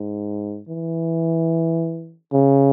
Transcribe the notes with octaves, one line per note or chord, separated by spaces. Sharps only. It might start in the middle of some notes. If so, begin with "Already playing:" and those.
Already playing: G#2
E3
C#3